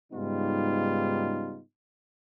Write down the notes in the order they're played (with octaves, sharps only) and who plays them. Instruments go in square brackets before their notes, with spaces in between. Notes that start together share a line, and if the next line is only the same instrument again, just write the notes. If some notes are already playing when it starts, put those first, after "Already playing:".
[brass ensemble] G#2 C#3 G3 B3 D#4 F4